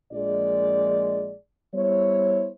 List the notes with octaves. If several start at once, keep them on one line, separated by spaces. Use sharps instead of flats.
A#1 G#3 D5
G3 B3 E4 C5 C#5